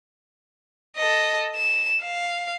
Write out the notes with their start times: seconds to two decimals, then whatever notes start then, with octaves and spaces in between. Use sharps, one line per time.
0.96 A4 D#5
1.56 E7
2.03 F5